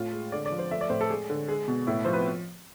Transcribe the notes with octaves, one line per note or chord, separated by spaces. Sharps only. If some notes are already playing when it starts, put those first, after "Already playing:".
Already playing: A2 F4
G#3
D3 D5
D5
F3
C5
A3 E5
D5
A2 C5
A4
G#3 G#4
D3
G#3 G#4
B2
A2 E4
F3 C5
B4